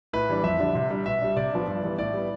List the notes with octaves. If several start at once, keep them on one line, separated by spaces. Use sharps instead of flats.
A2 B4
E3 G3 D4
F2 E5
D3 G3 D4
C3
G3 D4
B2 E5
G3 D4
C3 D5
F3 B3 D4
G2
E3 G3 B3
A2 D5
G3 B3